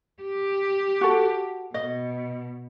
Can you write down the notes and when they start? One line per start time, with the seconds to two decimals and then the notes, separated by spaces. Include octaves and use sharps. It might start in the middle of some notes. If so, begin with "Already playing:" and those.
0.22 G4
1.01 F#4 A4
1.74 B2 D#5